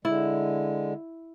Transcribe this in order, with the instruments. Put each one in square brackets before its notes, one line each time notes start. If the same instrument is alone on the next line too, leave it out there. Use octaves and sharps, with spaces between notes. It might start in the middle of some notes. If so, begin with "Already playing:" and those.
[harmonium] D3 G#3 [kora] E4